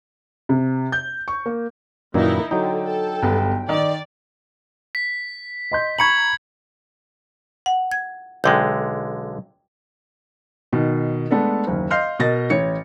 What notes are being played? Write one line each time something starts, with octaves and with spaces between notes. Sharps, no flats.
C3
G6
C#6
A#3
F#2 A#2 D#3 E3 A#3 D#4 E4
D3 F#3 D#4 G5
A4
G1 B3
D#3 D5
B6
D#5 C6 G6
A#5 B5 C#6 G#6 C#7 F#7
F#5
G#6
B1 D3 G#3 G5 G6
B2 D#3
G#3 A3 B3 D4 A4
F#1 D#2
D#5 F5 C6 F6 G6 C7
B2 A#4 D#5 A6 A#6
A1 C#5 C#7